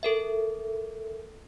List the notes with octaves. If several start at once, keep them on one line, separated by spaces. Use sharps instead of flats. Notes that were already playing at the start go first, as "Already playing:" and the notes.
A4 A#4 E5